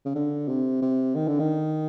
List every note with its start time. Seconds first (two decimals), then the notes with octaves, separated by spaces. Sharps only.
0.05 C#3
0.15 D3
0.48 C3
0.82 C3
1.15 D#3
1.28 D3
1.39 D#3